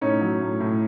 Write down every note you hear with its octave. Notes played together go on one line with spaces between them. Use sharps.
A2 C#4 D#4
F#3
A2
A2